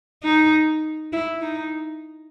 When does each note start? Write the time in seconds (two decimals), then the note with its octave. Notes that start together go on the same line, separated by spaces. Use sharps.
0.23 D#4
1.12 E4
1.42 D#4